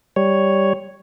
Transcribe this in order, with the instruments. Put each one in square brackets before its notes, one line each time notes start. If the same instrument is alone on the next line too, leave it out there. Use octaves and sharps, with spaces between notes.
[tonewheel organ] G3 C#5